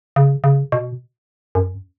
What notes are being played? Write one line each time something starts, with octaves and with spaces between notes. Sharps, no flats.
C#3
C#3
B2
F#2